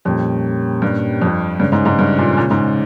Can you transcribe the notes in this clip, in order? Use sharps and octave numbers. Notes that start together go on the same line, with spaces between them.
F2 A#2 G3 A#3 C#4 G4
G2
F2
G2 C#3 G#3 C#4
G#2
G#2
G2
A#2
A#2
G#2